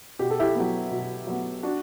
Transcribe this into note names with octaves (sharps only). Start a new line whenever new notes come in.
B2 G4
A4
E4 G4
F#3 B3
B2
F#3 B3
D4 F#4